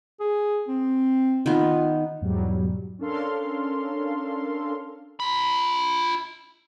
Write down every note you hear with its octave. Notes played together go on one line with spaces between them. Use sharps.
G#4
C4
D#3 B3 F4
E2 G#2 B2 F#3 G3
C#4 D4 A4 A#4 F5 C6
F4 B5